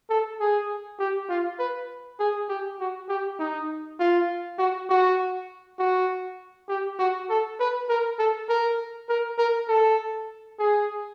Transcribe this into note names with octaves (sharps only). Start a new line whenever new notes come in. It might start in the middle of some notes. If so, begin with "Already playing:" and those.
A4
G#4
G4
F4
B4
G#4
G4
F#4
G4
D#4
F4
F#4
F#4
F#4
G4
F#4
A4
B4
A#4
A4
A#4
A#4
A#4
A4
G#4